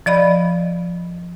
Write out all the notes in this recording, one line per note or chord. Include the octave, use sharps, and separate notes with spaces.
F3 D5 D#5 B5